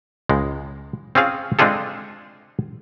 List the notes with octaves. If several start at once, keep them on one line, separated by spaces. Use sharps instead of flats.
C#2 G#3
C4 C#4 F4 G#4 F5
G#3 C4 D4 F4 G#4 A4